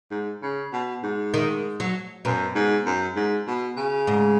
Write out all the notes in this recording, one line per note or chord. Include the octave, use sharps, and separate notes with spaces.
G#2
C#3
B2
G#2
D#3
F#3
F#2 B2
G#2
F#2
G#2
B2
C#3
G#2